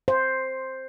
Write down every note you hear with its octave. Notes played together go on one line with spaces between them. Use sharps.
C5